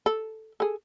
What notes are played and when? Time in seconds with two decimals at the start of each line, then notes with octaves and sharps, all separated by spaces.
0.06 A4
0.60 G#4 A4